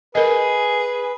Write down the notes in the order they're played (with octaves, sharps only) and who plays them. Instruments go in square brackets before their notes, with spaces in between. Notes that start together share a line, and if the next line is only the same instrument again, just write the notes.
[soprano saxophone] G#4 [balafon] A#4 D#5 [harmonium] B4